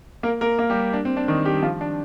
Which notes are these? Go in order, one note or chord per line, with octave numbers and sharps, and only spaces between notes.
A#3 A#4
A#3 A#4
A#3 A#4
G3 G4
D4
C4
D4
D#3 D#4
G3 G4
F3 F4
D4